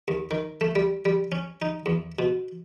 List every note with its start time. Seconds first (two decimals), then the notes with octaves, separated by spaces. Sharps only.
0.08 D#2
0.31 D#3
0.61 A3
0.75 G3
1.05 G3
1.32 C#4
1.62 D#4
1.86 E2
2.19 B2